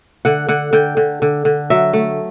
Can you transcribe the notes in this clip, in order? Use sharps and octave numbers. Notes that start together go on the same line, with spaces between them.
D3 F#5
D3 F#5
D3 G5
D3
D3
D3
F#3 E5
A3